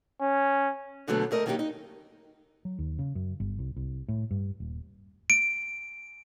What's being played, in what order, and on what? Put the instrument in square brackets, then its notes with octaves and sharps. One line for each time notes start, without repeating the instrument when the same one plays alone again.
[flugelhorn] C#4
[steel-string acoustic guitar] D2 B2 D3 F#3 A3 B3
D2 A3 A#4 D#5
D#3 F#3 A#3 D4 D#4 G4
D#4
[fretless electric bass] F#3
D#2
C#3
F#2
G1
C2
C2
A2
G2
D#1
[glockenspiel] D7